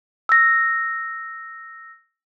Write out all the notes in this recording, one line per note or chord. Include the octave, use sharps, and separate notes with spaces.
E6 A#6